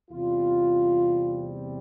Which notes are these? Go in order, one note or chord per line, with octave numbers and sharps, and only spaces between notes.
E2 C3 G3 C4 F4